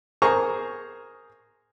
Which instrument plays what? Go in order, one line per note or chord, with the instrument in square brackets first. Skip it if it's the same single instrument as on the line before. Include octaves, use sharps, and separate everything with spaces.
[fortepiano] G#4 A#4 C5 A#5 C#6